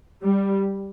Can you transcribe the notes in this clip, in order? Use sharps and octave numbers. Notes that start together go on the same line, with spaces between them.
G3